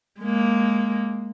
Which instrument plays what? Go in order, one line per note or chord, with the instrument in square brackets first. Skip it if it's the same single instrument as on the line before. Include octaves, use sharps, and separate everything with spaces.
[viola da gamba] G#3 A#3